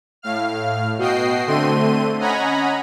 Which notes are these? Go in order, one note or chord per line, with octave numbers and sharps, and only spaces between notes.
A2 F5 F6
B2 F#4 D#5 G5 C7
D3 A3 C4 C6 D#7
C#4 D#5 F#5 G#5 A#5 B5